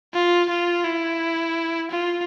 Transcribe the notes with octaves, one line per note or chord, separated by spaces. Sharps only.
F4
F4
E4
F4